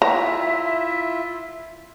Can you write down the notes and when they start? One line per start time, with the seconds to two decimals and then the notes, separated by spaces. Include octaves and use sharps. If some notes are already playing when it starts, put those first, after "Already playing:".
0.02 E4 F4 E5 A#5